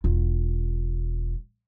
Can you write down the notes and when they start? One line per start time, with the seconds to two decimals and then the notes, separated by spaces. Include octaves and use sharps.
0.04 E1 F4